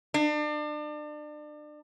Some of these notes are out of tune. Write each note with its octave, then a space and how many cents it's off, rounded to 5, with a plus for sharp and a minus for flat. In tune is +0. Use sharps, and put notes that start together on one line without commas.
D4 +35